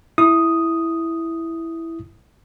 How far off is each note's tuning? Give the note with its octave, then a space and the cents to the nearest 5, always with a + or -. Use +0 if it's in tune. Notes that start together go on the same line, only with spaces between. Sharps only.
E4 +0 D#6 +0